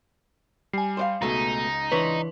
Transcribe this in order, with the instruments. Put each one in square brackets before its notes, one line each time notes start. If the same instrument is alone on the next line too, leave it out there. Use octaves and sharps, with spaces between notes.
[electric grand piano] G3 [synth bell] G#5 C7
[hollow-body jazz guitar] C5 D5 F5
[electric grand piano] C#2 [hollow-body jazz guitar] B2 A3 [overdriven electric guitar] D#4
[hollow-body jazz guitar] E3 D4 C#5 [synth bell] B4 C6